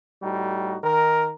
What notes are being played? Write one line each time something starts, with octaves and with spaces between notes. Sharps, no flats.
A2 G3 D#4 F#4
D#3 A#4